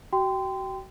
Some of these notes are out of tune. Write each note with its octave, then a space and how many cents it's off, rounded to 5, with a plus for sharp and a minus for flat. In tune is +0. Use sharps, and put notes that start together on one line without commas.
F#4 +35 G5 +0 C6 -25